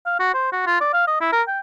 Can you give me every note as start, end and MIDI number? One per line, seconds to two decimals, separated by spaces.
0.06 0.15 77
0.20 0.33 66
0.34 0.48 72
0.52 0.63 66
0.67 0.78 65
0.81 0.93 74
0.93 1.06 77
1.07 1.19 75
1.21 1.32 64
1.33 1.42 70
1.48 1.60 79